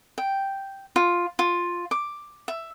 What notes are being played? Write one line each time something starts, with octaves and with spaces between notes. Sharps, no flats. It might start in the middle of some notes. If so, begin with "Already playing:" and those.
G5
F4
F4
D6
E5